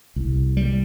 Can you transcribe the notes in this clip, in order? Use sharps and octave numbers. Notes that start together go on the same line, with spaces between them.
C2
G3